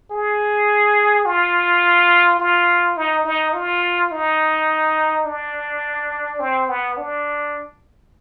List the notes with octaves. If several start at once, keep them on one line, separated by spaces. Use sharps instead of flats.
G#4
F4
F4
D#4
D#4
F4
D#4
D4
C4
B3
D4